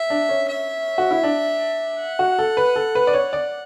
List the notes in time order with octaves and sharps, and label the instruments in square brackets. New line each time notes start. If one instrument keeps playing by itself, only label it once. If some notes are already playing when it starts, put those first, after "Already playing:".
Already playing: [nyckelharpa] E5
[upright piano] D4
C#4
[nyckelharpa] E5
[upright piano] F#4
E4
D4
[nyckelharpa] F#5
[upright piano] F#4
A4
B4
A4
B4
D5
C#5
D5